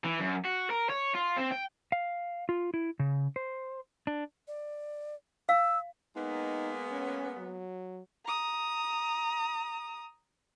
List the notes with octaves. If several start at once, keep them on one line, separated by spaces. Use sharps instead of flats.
E3
F#2
F#4
A#4
C#5
F4
C4
G5
F5
F4
E4
C#3
C5
D4
D5
F5 E6
G#3 A#3 B3 D#4
C#4
F#3
A#5 D#6